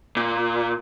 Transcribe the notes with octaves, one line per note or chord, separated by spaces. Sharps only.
A#2